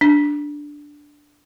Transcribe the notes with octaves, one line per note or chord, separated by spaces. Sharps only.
D4